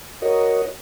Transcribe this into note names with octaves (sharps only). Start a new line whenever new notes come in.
F#4 A#4 C#5 D#5